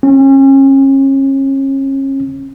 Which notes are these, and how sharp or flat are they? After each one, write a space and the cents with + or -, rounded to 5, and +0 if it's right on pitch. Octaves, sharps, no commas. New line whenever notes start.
C#4 -35